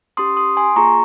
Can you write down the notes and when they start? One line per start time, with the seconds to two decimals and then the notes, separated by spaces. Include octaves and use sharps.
0.17 C#4 G4 C6 D#6
0.37 C6 D#6
0.57 G#5 C6
0.76 A#3 F4 G#4 A#5 C#6